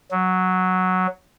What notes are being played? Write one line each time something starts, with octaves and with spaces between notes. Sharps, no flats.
F#3